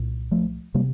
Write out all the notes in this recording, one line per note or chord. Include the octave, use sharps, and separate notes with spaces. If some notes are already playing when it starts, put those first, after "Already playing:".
Already playing: C2 A#2
F3 A3
C3 G3 A#3